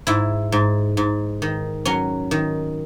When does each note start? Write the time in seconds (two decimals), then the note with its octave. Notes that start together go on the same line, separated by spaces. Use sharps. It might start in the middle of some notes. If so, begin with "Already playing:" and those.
0.07 G#2 E4
0.52 G#2
0.97 G#2
1.42 D#3
1.85 F#3 C#4
2.31 D#3